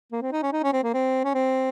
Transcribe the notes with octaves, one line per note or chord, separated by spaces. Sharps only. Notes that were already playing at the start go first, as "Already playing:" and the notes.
A#3
C4
D#4
C#4
D#4
C#4
C4
A#3
C4
C#4
C4